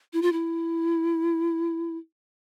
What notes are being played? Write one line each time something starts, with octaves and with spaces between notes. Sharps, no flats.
E4
F4
E4